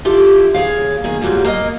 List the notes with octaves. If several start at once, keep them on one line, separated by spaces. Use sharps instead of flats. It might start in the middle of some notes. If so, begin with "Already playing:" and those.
E4 F4 G4 A4
D#2 G#4 C#5 F5
D#3 A#3 G#4
G#2 F#3 G3 A#3 F4
A#3 A#4 B4 D#5